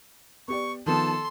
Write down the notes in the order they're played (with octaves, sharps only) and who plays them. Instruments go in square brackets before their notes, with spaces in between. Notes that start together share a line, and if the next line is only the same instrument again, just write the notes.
[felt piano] B3 G4 D5 [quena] C#6
[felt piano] D#3 F3 B3 [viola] A4 [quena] A5 [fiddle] C6